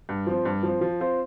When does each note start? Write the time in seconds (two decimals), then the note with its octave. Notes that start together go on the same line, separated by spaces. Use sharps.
0.09 G2
0.27 F3 C4
0.45 G2
0.63 F3 C4
0.81 F3
1.00 C4 F4 C5